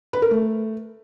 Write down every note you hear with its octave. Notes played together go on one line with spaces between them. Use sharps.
B4
A#4
A3